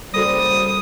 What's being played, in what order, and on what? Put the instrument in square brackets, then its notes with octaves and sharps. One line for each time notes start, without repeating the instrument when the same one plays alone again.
[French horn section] C#3 A#3 C5 [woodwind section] G3 [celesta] F#4 A4 A#6 [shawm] D#6